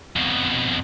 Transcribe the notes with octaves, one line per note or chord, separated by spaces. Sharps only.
F2 B2